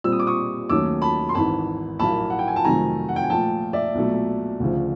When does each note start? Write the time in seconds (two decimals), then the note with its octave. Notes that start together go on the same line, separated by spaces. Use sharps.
0.04 A#2 G3 C4 E6
0.12 D#6
0.19 D6
0.27 C#6 D#6
0.69 D#2 D#3 F#3 A3 C#4 D6 E6
1.02 A5 B5
1.29 C6
1.35 G#1 G#2 E3 A5 B5
1.99 A#1 A2 F#3 A#3 A5 B5
2.30 F#5
2.39 G5
2.48 G#5
2.56 A5
2.65 F2 C3 D#3 F#3 A3 G#5 A#5
3.09 F#5
3.16 G5
3.23 G#5
3.30 A#2 F3 A3 G5 A5
3.73 D5 E5
3.95 B1 A#2 F#3 A3
4.60 D2 C#3 F3